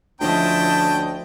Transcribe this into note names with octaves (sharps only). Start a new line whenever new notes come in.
D2 F3 C#4 E4 D#5 G5 A5